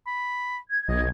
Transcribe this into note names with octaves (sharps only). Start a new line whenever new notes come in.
B5
G#6
B1 D#5